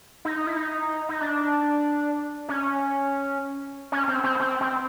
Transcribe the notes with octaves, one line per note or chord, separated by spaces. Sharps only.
D#4
E4
D#4
D#4
D4
C#4
C#4
C4
C4
C4
C4